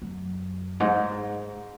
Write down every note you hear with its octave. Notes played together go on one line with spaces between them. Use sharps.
F#2
G#2